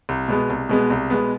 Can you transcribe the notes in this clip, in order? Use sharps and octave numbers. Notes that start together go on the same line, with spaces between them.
C2
B2 G#3 B3
C2
B2 G#3 B3
C2
B2 G#3 B3